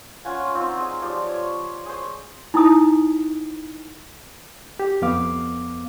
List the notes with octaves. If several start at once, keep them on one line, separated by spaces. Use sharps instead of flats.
C#4 F4 F#5 G#5
C4 D#4 F4 C#5
D#4 G#4
F3 G4 D5
C#5
G#4 C5
D#4 E4 G#5 D#6
G4
F2 B3 F5 D6